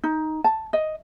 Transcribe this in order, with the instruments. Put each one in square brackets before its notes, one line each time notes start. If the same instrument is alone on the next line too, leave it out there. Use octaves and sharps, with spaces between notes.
[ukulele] D#4
A5
D#5